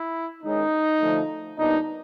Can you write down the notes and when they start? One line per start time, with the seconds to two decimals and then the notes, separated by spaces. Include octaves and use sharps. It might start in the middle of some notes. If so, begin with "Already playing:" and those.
Already playing: E4
0.44 D#3 G#3 C#4 D#4
1.01 D3 F3 A3
1.58 A#2 G3 B3 D4 D#4